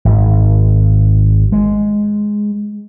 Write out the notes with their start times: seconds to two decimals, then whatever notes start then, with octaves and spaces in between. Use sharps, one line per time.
0.05 G#1
1.52 G#3